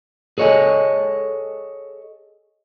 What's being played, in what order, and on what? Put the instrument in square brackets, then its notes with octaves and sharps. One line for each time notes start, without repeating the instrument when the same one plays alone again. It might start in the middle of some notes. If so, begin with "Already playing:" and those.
[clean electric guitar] G#4 A4 C#5 D#5 G#5